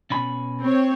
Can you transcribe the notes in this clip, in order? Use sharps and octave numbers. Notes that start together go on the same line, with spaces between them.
B2 C#4 B5
C4 C#5